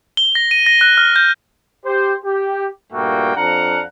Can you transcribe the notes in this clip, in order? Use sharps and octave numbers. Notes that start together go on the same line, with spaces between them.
G7
A#6
D#7
A#6
F#6
F6
G6
G4 C5
G4
G2 A#2 A3 A#3 F#4 G5
F2 D4 F5 F#5 A#5